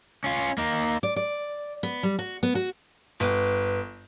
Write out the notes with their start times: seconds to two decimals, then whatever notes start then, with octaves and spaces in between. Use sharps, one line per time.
0.24 C#4 F4
0.58 A#3 D#4
1.03 D5
1.16 D5
1.83 B3
2.03 G3
2.19 F#4
2.43 B3
2.55 F#4
3.20 G1 B4